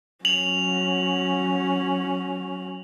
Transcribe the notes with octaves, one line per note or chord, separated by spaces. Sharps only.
F#3 C#4 F7 F#7